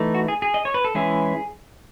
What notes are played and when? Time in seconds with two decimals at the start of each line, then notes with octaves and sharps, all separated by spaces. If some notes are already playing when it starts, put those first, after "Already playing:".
Already playing: E3 A3 D#4
0.14 F#4
0.28 G#4
0.42 G#4
0.54 D#5
0.65 C#5
0.74 B4
0.84 A4
0.95 E3 G#3 C#4 E4 G#4